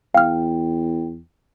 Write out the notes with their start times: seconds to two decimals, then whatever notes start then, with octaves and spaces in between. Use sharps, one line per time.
0.15 E2 F5 G5 F6